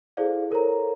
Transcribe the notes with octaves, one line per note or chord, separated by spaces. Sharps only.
E4 G#4 A4 C5 D5 F5
A4 A#4 C5 C#5 A#5